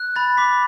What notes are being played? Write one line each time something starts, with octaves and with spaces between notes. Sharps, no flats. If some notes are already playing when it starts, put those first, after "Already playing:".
Already playing: F#6
B5 A6
D6 B6